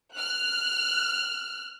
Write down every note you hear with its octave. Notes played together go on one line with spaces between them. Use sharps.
F6 F#6